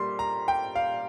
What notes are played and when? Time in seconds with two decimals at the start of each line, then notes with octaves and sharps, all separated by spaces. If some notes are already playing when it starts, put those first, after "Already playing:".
Already playing: A#2 G3 A#3 C6
0.19 A#5
0.48 G5
0.75 F5